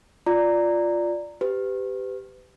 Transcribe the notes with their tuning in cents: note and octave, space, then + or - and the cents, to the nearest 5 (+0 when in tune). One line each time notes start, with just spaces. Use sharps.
F4 +0 D5 +0 A#5 -10
G4 +0 B4 +35